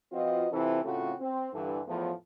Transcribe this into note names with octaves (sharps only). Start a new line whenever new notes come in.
F3 C4 F4 F#4 B4 D#5
C3 E3 C4 E4 F4 A4
A2 C#3 A3 C4 F4 F#4
C4
G2 D3 E3
E2 A2 F3